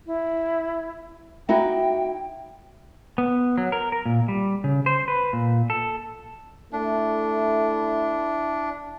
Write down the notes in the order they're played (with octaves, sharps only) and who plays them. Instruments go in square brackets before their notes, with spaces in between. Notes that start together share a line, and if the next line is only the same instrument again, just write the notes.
[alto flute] E4
[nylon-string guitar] D#4 E4 F#4 [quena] G5
[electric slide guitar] B3
F#3
A#4
A#4
A#2
G3
C#3
C5
B4
A#2
A4
[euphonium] A3 [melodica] D4 [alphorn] E4